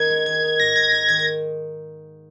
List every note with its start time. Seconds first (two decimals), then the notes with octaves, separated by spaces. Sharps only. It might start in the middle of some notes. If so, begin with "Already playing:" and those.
Already playing: D#3 A#3 C#4 D#4 G#4 G#6
0.10 G#3
0.26 D#3 G#6
0.43 D#4
0.59 G#2 A#6
0.76 G#2 G#6
0.92 D#4 A#6
1.09 D#3 G#6
1.20 G#6